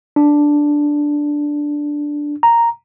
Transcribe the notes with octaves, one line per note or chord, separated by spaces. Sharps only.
D4
A#5